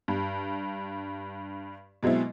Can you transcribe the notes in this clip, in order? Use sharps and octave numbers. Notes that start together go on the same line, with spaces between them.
G2
B2 F#3 G#3 C4 E4